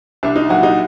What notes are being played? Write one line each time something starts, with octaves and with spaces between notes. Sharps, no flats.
C2 D4
D#4
A#2 F#3 F#4
D#4